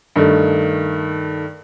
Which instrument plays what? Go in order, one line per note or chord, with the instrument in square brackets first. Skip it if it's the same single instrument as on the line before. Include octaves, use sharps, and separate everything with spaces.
[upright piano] G2 D#3 A3